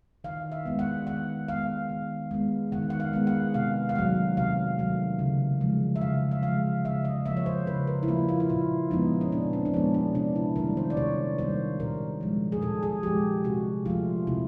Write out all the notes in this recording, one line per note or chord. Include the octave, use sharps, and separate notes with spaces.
D#3 F5
E5
G#3 B3
F#5
D#3 F#5
G#3 B3 F5
D#3
G#3 B3
D#3 F#5
F#5
F5
G#3 B3
F#5
C3 F5
F5
D#3 F#3 A3 F#5
C3 F5
D#3 F#3 A3
C#3
F3 G#3
E5
C#3 F5
E5
F3 G#3 F5
C#3 E5
D#5
F3 A#3 E5
C#5
C5
C#3 B4
A#4
E4
F3 A#3 F4
F4
E4
A#2 F4
F3 G#3 B3 D#4
C#4
A#2 D4
C4
D4
F3 G#3 B3 C#4
D4
C3 D4
E4
D#3 G3 A#3 A#4
C5
D5
C3 C#5
D#3 G3 A#3 C5
A#2 A#4
F3 G#3
G#4
A#2 A4
G#4
F3 G#3 G4
C3 F#4
F3 A3 F4
C3 E4